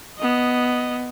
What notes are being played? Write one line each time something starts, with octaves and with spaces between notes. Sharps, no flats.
B3 D#5